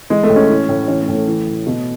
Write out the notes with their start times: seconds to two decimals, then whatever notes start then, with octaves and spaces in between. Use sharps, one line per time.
0.10 E3 G#3
0.23 A3
0.29 A2
0.36 C#4
0.49 E3
0.69 A2
0.88 E3 C#4
1.02 A3
1.08 A2
1.15 A3
1.28 E3
1.47 A2
1.67 B2